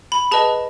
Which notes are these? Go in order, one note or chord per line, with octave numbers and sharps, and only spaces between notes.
B5
G#4 B4 D#5 A5